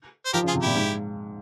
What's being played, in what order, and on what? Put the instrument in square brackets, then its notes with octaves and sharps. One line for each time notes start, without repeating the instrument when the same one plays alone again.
[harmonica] C5
[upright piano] F3 [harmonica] G4 A#4
[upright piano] C#3 [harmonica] F4 G#4
[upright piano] C3
[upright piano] A#2 [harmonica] E4 G4
[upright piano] G#2